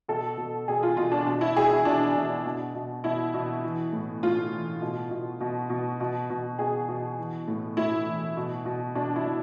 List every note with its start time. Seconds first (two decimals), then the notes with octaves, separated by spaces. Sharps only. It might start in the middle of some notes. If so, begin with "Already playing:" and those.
0.08 B2 A4
0.37 B2
0.68 B2 G#4
0.83 F4
0.97 B2 F4
1.12 D4
1.26 B2
1.41 E4
1.56 B2 G#4
1.71 E4
1.85 B2 D4
2.16 B2
2.45 B2
2.75 B2
3.04 B2 E4
3.34 B2
3.64 E3
3.93 A2
4.23 A2 F4
4.53 E3
4.81 B2
5.11 B2
5.40 B2
5.70 B2
6.00 B2
6.30 B2
6.59 B2 G#4
6.89 B2
7.18 E3
7.48 A2
7.77 A2 E4
8.07 E3
8.37 B2
8.65 B2
8.95 B2 D4
9.16 E4
9.25 B2